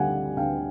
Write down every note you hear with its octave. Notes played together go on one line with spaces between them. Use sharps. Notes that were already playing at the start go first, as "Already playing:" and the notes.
Already playing: D2 D3 G3 C4 F#5 G#5
D2 F5 G5